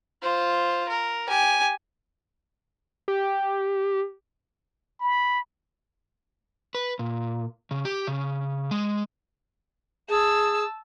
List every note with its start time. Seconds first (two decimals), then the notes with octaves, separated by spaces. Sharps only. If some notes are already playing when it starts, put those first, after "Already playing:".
0.22 F4 C5
0.89 A#4
1.27 G4 G#5
3.08 G4
5.00 B5
6.75 B4
6.99 A#2
7.71 C#3
7.85 G4
8.07 C#3
8.71 G#3
10.09 G#4 A5 E6